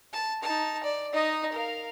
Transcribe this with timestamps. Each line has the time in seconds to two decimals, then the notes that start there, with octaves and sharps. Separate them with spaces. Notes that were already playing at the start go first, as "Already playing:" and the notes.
0.13 A5
0.43 D#4 A5
0.83 D5
1.13 D#4 D#5
1.52 A#4 F5